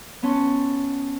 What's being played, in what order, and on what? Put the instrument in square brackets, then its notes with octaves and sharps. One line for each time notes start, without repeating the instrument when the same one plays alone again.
[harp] B3 C#4 A5 C6